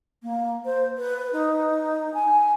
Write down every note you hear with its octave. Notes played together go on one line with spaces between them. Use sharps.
A#3
C5
B4
D#4
G#5